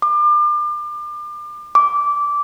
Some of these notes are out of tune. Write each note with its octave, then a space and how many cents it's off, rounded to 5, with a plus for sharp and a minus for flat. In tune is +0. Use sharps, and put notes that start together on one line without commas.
D6 +35
D6 -15